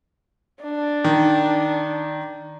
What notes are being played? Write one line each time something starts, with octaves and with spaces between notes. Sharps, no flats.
D4
D#3